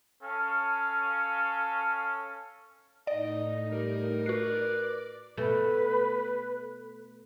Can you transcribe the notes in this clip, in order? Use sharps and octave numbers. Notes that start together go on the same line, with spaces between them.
C#4 A4 F5
A2 D#4 D5 D#5
G3 A#4
F#4 B4 D5 C7
B2 A3 B4